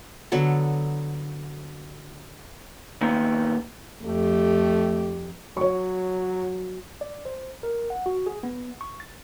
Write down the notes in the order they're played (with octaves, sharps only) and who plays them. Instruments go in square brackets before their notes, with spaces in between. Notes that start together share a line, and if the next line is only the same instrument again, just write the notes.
[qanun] D3 F#3 B3 A4
[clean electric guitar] A#2 D#3 B3
[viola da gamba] F2 G4 [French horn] A3
[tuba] F#3 [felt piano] C#5 C#6
[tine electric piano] D5
C5
A#4
F#5
F#4
G#4
B3
C#6
A6